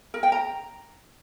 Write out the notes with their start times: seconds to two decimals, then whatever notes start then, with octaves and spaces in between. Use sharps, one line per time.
0.14 A#4
0.23 G5
0.32 A#5